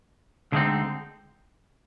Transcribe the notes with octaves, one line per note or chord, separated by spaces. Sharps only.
D2 D3 G#3 C4 D#4